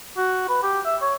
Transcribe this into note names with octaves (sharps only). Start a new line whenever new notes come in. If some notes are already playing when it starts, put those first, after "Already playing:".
F#4
B4
G4
E5
C#5